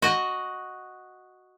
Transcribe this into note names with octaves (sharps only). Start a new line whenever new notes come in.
F#4 D#5